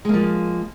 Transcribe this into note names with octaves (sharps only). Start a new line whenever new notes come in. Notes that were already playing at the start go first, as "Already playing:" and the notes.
F3 G#3 A#3